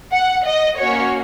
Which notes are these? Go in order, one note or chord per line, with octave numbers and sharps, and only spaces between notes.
F#5
D#5
A#3 C#4 F#4 C#5